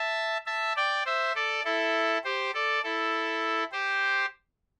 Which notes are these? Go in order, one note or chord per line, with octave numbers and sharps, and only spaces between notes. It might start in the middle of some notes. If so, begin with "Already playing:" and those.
Already playing: E5 A5
E5 A5
D5 G5
C5 E5
A4 D5
E4 A4
G4 C5
A4 D5
E4 A4
G4 C5